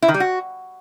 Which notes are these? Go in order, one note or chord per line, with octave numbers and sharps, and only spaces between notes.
E4
D#3
G3
F#4